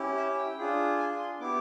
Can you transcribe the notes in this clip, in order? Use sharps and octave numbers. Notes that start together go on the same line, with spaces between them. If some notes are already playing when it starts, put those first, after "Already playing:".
Already playing: C#4 E4 G4
E5
G5
D4 F4 G#4
G#5
C6
B3 E4 G4 D6